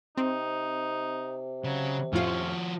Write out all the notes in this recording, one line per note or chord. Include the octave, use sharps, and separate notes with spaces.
C3 C4 D#4
C#3 F#3
F2 A2 F3 C#4 F4 F#4